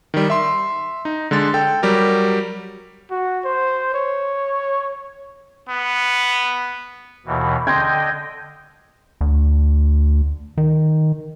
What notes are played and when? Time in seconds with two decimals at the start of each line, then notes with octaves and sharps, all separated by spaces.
0.14 D#3 G3
0.30 E5 C6
1.05 D#4
1.31 D3 G#3 C6 A6
1.54 A4 G5
1.83 F#3 G3 G4 A#4
3.10 F#4
3.45 C5
3.94 C#5
5.69 B3
7.26 D#2 B2 E3
7.67 D3 D#5 G5 C6 G6 G#6
9.21 D2
10.58 D#3